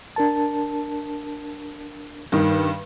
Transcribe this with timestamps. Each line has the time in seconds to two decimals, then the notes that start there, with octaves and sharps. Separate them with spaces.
0.16 D4 A#4 A5
2.32 G2 D#3